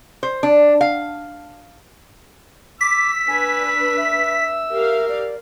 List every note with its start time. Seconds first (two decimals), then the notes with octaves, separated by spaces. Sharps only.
0.23 C5
0.43 D4
0.81 F5
2.81 D6 E6 B6
3.28 D4 B4 G#5
3.97 E5
4.72 G4 A#4 F5
5.08 D5